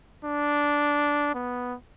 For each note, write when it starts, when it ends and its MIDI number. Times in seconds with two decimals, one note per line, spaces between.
0.25 1.34 62
1.35 1.75 59